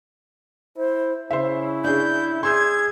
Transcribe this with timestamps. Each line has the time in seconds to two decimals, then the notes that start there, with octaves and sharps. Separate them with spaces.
0.77 E4 C5
1.30 C#3 E4 C5 E5
1.85 D4 G#4 G6
2.43 G#4 C6 E6 G6 G#6